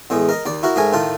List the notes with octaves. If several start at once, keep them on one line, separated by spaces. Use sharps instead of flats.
E2 A2 G#3
A#4 D#5
D#2 D5
E4 F#4 A#4
G#2 A3 A#4 G#5
A2 D#3 F4 A5